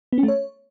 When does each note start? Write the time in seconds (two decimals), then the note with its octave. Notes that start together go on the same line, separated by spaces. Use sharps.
0.13 B3
0.18 C#4
0.23 A3
0.28 C#5